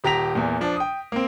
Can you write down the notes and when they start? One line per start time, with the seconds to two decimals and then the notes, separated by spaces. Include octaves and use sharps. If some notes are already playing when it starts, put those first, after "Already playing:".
0.04 D#1 G4 A#5 A#6 B6 F7
0.35 E2 A#2
0.61 F3 D4
0.76 G5 D#6
1.12 A#3 C4